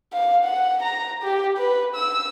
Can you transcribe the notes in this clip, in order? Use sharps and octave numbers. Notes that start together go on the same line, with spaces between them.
F5
F#5
A#5
G4
B4
E6